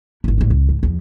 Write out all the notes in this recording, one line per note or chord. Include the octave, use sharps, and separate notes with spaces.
G#1 E4
A1 A3
C#2
G#2
E2 F3